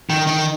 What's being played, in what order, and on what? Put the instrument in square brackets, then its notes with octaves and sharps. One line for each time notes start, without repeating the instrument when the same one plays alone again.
[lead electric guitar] D#3
D#3